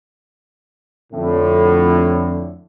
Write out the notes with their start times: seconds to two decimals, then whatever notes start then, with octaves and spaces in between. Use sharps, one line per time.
1.13 F2 A2 D3